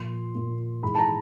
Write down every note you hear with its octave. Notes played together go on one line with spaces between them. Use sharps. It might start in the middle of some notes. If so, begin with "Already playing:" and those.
Already playing: A#2 F3 A#3 C6
A#2 F3 A#3
G#2 E3 G#3 B5
A5
A#5